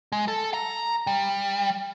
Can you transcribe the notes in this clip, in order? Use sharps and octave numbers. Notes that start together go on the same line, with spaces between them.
G#3
A4
A#5
G3